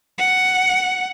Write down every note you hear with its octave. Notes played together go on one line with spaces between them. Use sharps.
F#5